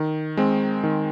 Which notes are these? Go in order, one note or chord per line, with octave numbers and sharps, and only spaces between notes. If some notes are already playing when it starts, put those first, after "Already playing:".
Already playing: D#3
G#3 C4
D#3